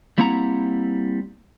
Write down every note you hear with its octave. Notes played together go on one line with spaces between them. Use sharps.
G3 A#3 C4 E4 F#5 A#5